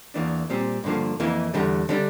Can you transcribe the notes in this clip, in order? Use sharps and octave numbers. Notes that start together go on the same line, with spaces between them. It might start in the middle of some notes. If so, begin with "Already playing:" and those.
E2 E3 A#3 D4
A#2 G3 C4
G2 D3 F3 A#3
F2 E3 A#3 E4
E2 D3 G3
D3 G3 D4